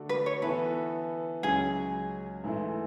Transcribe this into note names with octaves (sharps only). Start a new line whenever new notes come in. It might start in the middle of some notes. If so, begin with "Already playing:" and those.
Already playing: D3 A3 D4 F#4 A4
B4
C#5
E3 B3 E4 A4 B4
C#2 C#3 F#3 C#4 G#4
G#2 E3 A3 E4